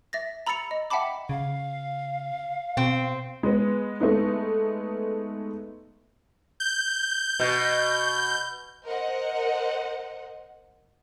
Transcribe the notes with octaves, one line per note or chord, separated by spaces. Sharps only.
E5 A6 A#6
A#5 B5 E6 A6 C#7 F7
D#5
E5 F#5 G5 A5 B5 D6
C#3 F5
B2 C4
G#3 B3
G#3 A3 B3 D#4
G6
B2
A#4 C5 D#5 F#5